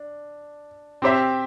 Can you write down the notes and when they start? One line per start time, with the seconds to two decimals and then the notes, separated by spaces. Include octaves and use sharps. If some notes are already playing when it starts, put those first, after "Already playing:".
Already playing: D4
1.02 C4 G4 C5 E5